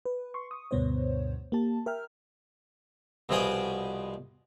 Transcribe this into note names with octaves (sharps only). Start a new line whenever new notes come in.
B4
C6 C#6
C#6 D#6
D2 G2 B2 B3 C5 C#5
A#3 G4 A5
A#4 E5 G5 F6
C2 B2 F3 G#4 G5 D#6